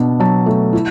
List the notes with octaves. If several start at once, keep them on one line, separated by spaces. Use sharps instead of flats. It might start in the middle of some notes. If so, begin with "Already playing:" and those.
Already playing: B2 D4
F#3 A5
A3
E4